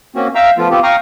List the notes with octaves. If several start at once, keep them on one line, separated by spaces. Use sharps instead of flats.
A#3 C4 C#4 F#4
E5 F5 G5 A#5 E6
F3 A3 B3 F4
B3 C4 F4 G4
F5 G5 A#5 C#6 D#6 F6